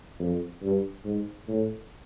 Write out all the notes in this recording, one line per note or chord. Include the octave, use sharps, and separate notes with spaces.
F2
G2
G#2
A2